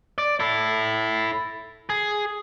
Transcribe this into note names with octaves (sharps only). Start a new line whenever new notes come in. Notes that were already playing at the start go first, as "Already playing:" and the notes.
D5
E4 A4
G#4